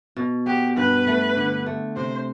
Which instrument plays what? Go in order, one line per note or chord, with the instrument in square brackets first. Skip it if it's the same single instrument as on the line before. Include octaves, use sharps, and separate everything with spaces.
[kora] B2
[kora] B3 [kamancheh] G4
[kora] G2 [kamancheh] B4
[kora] A3
D3
A3
[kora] C3 [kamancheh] C5